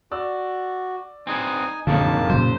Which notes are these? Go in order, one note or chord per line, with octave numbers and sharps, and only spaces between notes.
F#4 D5 E6
C4 D#4 G#4 B4 G#5
F#1 B1 F2 A2 D3 D#3 A#3 A5
A#2 C#3 F#3 C5